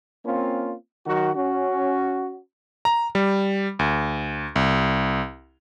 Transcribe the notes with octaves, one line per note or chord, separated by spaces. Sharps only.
A#3 C4 C#4 F4
D#3 F#3 F#4
C#4 F#4
A#5
G3
D2
C2